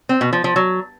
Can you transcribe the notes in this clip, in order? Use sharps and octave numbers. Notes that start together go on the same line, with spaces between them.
C4
B2
F3
F3
F#3